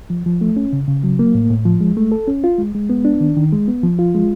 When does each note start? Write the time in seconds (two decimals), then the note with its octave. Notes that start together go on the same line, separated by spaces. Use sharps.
0.10 F3
0.26 F3
0.41 A3
0.56 C#4
0.73 C#3
0.88 C#3
1.04 F#3
1.19 A#3
1.35 A2
1.50 A2
1.65 F3
1.81 G#3
1.97 A3
2.12 A4
2.27 C#4
2.44 F4
2.58 G#3
2.75 G#3
2.90 B3
3.05 D4
3.21 D#3
3.37 D#3
3.52 G#3
3.68 B3
3.83 F3
3.99 F4
4.15 G#3